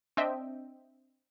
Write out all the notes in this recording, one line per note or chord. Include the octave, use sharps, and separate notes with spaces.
C4 D4 D#5 E5 G5